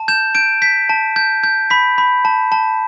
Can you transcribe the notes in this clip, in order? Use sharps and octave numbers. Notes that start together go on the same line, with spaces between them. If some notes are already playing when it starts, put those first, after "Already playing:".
Already playing: A5
G6 E7
G6 D7
G6 B6
A5
G6
G6
B5 B6
B5
A5
A5